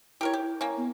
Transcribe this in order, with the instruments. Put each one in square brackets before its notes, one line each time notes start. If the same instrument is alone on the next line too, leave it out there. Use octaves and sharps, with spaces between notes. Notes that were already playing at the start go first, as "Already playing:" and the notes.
[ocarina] E4 [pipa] G4 A#4 C#5
[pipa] G4
A#3 C#4
[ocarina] B3